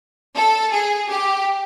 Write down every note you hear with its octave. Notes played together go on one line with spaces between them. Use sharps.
A4
G#4
G4